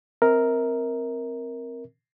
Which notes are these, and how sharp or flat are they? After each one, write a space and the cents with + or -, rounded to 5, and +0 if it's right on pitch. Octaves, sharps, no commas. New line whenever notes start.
C4 +0 A#4 +0 E5 -40